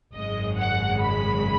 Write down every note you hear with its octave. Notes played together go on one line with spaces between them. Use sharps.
G#1 F#2 C#3 G#3 D#5
F#5
B5